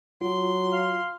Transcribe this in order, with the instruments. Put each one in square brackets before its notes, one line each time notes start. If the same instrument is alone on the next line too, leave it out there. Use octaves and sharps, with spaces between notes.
[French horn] F#3 [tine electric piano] F4 [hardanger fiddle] C6
[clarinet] F5